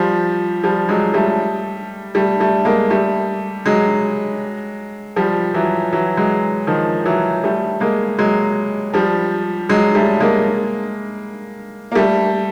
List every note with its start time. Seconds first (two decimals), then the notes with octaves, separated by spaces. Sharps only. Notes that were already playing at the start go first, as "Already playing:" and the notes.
Already playing: F3 G3
0.64 F3 G3
0.89 F#3 G#3
1.14 G3 A3
2.15 G3 A3
2.40 G3 A3
2.65 G#3 A#3
2.90 G3 A3
3.66 F#3 G#3
5.16 F3 G3
5.54 E3 F#3
5.92 E3 F#3
6.17 F#3 G#3
6.67 D#3 F3
7.05 E3 F#3
7.44 G3 A3
7.80 G#3 A#3
8.19 F#3 G#3
8.93 F3 G3
9.69 F#3 G#3
9.95 G3 A3
10.20 G#3 A#3
11.92 A#3
11.95 G3 A3